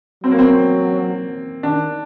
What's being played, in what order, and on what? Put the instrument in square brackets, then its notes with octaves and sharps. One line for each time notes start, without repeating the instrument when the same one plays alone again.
[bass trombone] F#3 [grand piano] C4
[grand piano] A#3
C4
[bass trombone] D#3 [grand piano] D4